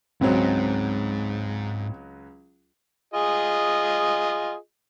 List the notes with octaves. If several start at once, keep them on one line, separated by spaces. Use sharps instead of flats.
C#2 G#2 F#3 C4
F4 G#4 D#5